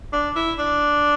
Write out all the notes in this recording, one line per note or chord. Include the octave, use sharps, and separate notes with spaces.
D4
E4
D4